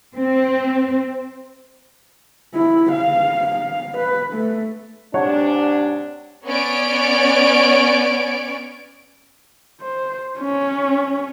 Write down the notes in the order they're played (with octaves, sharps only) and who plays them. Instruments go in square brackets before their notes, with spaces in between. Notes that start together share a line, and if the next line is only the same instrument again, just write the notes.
[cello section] C4
[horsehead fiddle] E4
F5
F5
B4
A3
[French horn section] G#2 C3 D4 [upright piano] C#5 F#5
[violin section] B3 C#4 C#5 D5 D7
[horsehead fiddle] C5
C#4